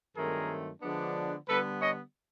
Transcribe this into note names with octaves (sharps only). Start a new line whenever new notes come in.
G2 D#3 F#3 A3 C4 G#4 A#4
D3 F3 G#3 B3 D4
D3 G3 B3 A4 B4
C#5 D#5